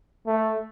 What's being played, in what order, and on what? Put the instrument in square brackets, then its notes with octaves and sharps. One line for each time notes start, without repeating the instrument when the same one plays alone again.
[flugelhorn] A3